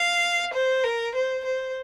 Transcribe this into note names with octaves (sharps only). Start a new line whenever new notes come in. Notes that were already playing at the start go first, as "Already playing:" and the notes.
Already playing: F5
C5
A#4
C5
C5